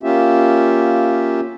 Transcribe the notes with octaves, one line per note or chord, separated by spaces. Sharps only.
A#3 C#4 F4 G4 E5